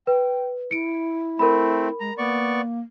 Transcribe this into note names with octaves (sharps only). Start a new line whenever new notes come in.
B4 G5
E4 C#7 D7
A3 C4 A#4 B5
G#3 A#5
A#3 B3 D5 C#6